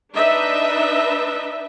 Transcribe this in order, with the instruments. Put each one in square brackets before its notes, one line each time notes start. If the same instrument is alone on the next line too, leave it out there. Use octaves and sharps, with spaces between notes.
[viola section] D4 D#4 B4 D#5 E5